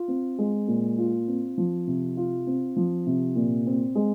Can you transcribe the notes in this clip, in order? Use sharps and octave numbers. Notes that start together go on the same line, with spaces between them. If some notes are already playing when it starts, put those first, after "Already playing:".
Already playing: F4
C4
G#3
A#2
F4
C4
F3
C3
F4
C4
F3
C3
A#2
C4
G#3